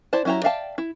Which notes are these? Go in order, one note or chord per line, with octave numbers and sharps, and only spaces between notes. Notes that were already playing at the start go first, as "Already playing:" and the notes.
E4 C5 D5 A5
F#3 C#4 E4 G4 A#5
D5 E5 F5 G5 A5
E4